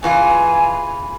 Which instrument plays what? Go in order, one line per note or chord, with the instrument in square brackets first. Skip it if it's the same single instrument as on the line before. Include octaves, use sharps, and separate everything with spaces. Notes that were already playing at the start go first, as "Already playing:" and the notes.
[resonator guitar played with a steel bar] C#3 E3 F4 [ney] G#5